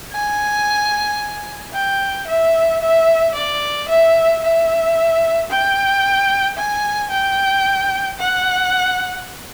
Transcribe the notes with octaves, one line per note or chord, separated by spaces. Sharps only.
G#5
G5
E5
E5
D5
E5
E5
G5
G#5
G5
F#5